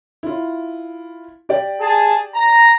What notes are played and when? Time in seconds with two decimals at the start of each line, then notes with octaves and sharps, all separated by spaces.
0.23 E4 F4
1.49 G4 D5 G5
1.81 G#4 A5
2.35 A#5